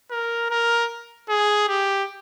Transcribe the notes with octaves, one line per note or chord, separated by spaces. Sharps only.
A#4
A#4
G#4
G4